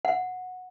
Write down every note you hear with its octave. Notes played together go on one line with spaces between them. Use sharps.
F#5